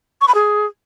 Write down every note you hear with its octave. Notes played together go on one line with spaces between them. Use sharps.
C#6
B5
G#4